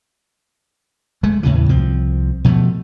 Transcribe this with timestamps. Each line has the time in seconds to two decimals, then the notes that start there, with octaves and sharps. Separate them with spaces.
1.23 G#3 A3
1.43 D#2 A2 C#3 E3
1.69 C2 F3 C4
2.45 B2 F3 G#3 A3